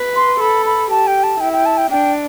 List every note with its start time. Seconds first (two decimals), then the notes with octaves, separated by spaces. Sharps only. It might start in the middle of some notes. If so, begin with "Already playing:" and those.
Already playing: B4
0.16 C6
0.40 A4 B5
0.66 B5
0.90 G4 A5
1.07 G5
1.23 A5
1.40 E4 G5
1.53 G5
1.66 A5
1.78 G5
1.91 D4 G5